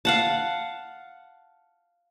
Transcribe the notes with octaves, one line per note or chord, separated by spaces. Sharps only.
F5 F#5 A5